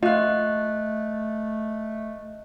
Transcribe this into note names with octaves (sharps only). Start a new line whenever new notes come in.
A3 F4 D#5 F5 F#6